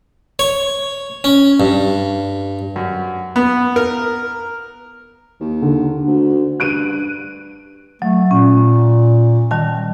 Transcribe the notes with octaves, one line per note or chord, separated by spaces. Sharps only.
C#5
C#4
G2
F#2
B3
A#4
D#2
D3
D2
G2 F#6 D7 D#7
F#3 A3
A#2 C#4
D#3 G3 A5